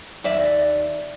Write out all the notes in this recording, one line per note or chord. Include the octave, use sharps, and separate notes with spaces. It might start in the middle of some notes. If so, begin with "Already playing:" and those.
D#2 D5 E5